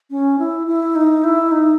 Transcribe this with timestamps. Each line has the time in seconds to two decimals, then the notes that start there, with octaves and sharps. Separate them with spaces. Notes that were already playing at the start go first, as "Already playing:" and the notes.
0.11 C#4
0.39 E4
0.67 E4
0.95 D#4
1.24 E4
1.52 D#4